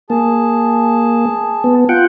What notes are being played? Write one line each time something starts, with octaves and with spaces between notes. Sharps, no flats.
A#3 G#4 A5
B3
F4 F#5 G5